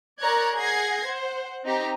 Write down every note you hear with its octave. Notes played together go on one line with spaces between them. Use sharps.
A#4 C#5 D5 A#5 F#6 G#6
G#4 F#5 G#6 A#6 C7
C5 F#5
C4 D#4 G4 A#5